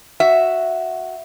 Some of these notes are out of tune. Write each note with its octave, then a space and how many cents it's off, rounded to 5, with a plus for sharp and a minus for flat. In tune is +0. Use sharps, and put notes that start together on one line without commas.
F#4 +0 E5 +0